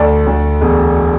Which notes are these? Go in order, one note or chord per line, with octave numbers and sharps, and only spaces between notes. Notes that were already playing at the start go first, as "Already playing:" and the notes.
Already playing: D2 A4 D5
D2
E1